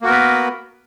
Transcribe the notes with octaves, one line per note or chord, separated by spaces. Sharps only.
A#3 B3 F#4 A#4 B4